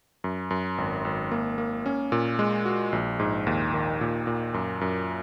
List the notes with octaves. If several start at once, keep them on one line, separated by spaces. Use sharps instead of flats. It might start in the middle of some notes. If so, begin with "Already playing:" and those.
F#2
F#2
G#1
G#1
A#3
A#3
C#4
A#2
G#3
F#4
A#1
G#2
D#2
D#3
A#2
A#2
F#2
F#2